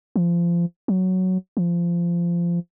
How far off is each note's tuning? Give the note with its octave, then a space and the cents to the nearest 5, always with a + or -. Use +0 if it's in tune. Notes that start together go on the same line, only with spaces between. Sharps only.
F3 -25
F#3 +5
F3 -20